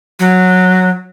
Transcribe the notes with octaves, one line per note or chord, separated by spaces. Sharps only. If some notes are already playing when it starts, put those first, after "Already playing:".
F#3